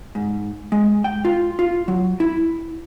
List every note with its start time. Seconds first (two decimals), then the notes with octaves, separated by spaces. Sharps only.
0.15 G#2
0.72 G#3
1.04 G5
1.25 F4
1.59 F4
1.88 F#3
2.20 E4